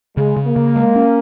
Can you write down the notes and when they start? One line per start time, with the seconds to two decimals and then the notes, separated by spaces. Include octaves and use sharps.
0.17 C#3 G#3
0.37 C#3
0.47 A#3
0.56 C#3
0.76 G#3
0.96 C#4